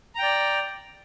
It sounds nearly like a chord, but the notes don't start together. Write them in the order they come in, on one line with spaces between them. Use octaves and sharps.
A#5 G5 D5